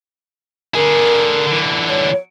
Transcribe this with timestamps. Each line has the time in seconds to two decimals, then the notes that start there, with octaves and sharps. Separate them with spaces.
0.75 D3 G#4 A#4
1.47 D3 E3
1.89 C#5